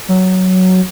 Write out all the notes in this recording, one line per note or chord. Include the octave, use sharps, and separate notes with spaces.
F#3